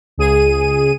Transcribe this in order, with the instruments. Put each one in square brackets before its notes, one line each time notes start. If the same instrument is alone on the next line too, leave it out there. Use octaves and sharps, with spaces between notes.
[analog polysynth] C#2 G#4 D#7